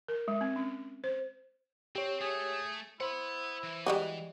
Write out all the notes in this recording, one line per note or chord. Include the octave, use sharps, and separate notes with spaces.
A#4
G#3
C4
C#4
C5
C4 G4 C#5
A3 G#4
E4 C5 F#5 B5
E3
G3 G#3 F#4